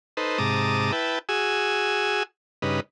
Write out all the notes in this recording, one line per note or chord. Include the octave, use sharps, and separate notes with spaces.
D#4 A4 B4 C5
G#2 C3 A5 A#5 D6 D#6
E4 B4 G5 A5
F#4 G#4 G#5 E6
G2 C#3 D#4 B4